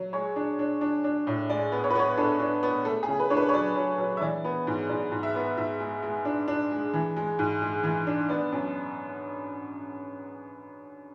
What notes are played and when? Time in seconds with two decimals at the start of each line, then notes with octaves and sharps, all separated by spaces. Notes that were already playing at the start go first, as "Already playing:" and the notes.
Already playing: F#3
0.13 G#3 C#5
0.36 D4
0.59 D4
0.81 D4
1.04 D4
1.27 A2
1.50 G#3 D5
1.72 B3
1.84 C#5
1.90 B4
1.95 B3 C#5
2.18 D4 A4
2.40 D4
2.63 B3
2.85 A3 A4
3.03 G#4
3.08 C#3
3.20 B4
3.30 D4 C#5
3.37 B4
3.49 C#5
3.53 F#3 D5
3.76 F#3
3.98 F#3
4.17 E5
4.21 E3 D5
4.44 B3
4.67 G#2
4.89 G#2 D5
5.12 G#2
5.23 E5
5.35 B3
5.57 G#2 E5
5.80 G#3
6.03 G#3
6.25 D4
6.48 D4
6.71 G#3
6.94 E3
7.16 G#3
7.39 G#2
7.61 G#3
7.84 E3
8.07 D4
8.29 B3 D5
8.52 F#2